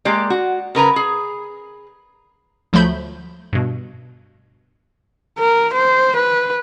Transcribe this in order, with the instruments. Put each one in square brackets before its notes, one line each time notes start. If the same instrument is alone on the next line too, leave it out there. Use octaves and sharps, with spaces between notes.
[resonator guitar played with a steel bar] G#3 A#3 G4 D5
F#4
C#3 A#4 B4 A#5
G#4
[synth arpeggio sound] D2 F3 F#3 A3 B5 G6
G2 B2
[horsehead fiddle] A#4
C5
B4